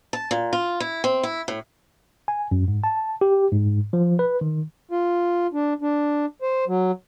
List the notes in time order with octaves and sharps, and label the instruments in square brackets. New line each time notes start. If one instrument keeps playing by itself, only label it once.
[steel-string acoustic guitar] A5
A#2
F4
E4
C4
E4
A2
[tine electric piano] G#5
F#2
G#2
A5
G4
G#2
F3
B4
D#3
[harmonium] F4
D4
D4
C5
F#3